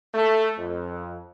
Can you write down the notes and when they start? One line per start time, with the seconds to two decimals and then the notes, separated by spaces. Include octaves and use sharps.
0.14 A3
0.58 F2